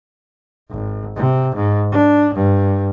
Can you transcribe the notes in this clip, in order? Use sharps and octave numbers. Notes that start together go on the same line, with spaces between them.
G#1
C3
G#2
D4
G2